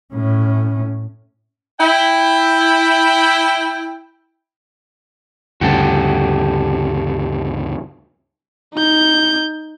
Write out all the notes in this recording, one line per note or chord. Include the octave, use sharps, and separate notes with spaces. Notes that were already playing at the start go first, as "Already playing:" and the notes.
A2 C#4
E4 G5
D2 G2 C#3 F#4 G4 A4
D#4 G6